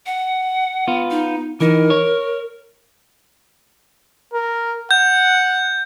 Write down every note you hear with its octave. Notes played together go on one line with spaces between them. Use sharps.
F#5
B3 F4
D#4
E3 D#4 A#4
C#5
A#4
F#5 G6